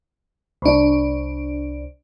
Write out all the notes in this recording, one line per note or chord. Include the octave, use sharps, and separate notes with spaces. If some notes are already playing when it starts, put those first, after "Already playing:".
C2 D4